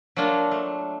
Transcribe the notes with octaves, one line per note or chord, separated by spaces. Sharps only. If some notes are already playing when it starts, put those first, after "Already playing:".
F#3 A#3 D4 F4
A3